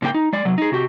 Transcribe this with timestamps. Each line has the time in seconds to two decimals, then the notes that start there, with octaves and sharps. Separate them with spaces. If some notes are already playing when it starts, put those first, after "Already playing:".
0.02 G#2 C#3 A#3 G4 G5
0.14 D#4
0.33 G#3 D5
0.45 C3 F#3
0.58 D#4 G#4
0.72 C3 F#4 G4